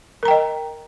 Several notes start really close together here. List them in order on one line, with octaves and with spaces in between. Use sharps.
A#4 A#5 G5 D#5